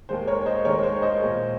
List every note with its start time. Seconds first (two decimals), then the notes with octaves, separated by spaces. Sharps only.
0.09 D#2 D#3 G#3 C5
0.27 A#4 C#5
0.46 C5 D#5
0.65 D#2 D#3 G#3 A#4 C#5
0.83 C5
1.02 C5 D#5
1.21 A#2 G#3